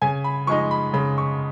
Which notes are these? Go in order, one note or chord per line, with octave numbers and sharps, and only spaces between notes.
C#3 G#5
B5
F3 G#3 D#4 C#6
B5
C#3 B5
C#6